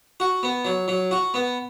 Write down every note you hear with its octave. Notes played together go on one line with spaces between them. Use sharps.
F#4
B3
F#3
F#3
F#4
B3